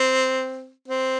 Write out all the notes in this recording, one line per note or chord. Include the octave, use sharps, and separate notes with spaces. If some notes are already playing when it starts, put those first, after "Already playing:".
Already playing: C4
C4